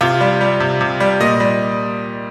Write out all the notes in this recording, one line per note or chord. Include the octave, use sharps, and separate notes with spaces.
C3 F4
G3
G3
C3
C3
G3
A#2 D#5
G3